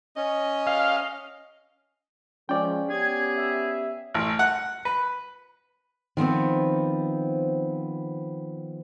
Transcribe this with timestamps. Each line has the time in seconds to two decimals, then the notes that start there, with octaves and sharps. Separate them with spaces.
0.17 C#4 D#5
0.67 F5
2.49 F3 G#3 C#4 D5 G5
2.90 B3 C#4 G4 G#4 G#6
3.37 E5
4.14 A1
4.39 F#5
4.85 B4
6.17 D#3 F3 B3 C4